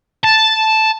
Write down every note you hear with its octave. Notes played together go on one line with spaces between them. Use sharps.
A5